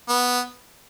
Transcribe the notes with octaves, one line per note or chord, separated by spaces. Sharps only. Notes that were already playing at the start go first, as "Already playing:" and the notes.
B3